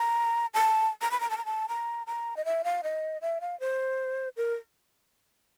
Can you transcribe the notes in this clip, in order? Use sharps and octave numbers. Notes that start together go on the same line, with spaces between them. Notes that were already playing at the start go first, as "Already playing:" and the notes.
Already playing: A#5
A5
A#5
B5
A#5
A5
A#5
A5
A#5
A#5
D#5
E5
F5
D#5
E5
F5
C5
A#4